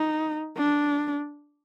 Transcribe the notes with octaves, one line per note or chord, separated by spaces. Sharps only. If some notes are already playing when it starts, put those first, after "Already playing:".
Already playing: D#4
D4